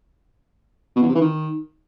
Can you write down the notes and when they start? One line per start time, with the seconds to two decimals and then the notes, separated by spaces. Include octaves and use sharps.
0.96 B2
1.02 E2
1.08 C3
1.15 E3
1.21 D#3